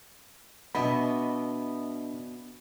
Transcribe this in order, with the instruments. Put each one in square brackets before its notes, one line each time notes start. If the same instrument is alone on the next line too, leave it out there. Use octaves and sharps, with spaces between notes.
[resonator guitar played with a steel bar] B2 B3 [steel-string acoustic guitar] D4 D#5 E5 [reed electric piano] B5